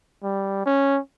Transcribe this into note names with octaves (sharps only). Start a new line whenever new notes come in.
G3
C#4